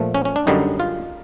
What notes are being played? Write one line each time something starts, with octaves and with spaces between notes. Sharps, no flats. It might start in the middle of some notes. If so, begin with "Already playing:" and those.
Already playing: A#2 F3 A3
C#4
C#4
D4
F#2 D3 G3 D#4
F4